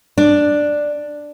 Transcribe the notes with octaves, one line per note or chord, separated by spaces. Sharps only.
D4